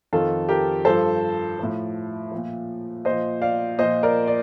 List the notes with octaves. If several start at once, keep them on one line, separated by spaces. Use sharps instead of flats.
F2 D#3 F4 A4
G4 A#4
G2 F3 A4 C5
A2 F3
A#2 F3
A#2 F3 C5 D#5
D5 F5
A#2 F3 C5 D#5
A#4 D5
D5